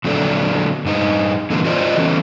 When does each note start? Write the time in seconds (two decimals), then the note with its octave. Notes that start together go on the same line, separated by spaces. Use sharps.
0.04 A#2 D3 F#3 A4 D5
0.85 G2 D#4
1.50 A#2 D3 E3 G#3 A#3
1.65 F4 F#4 C5 D5 D#5
1.97 E3 A3 B3 C#4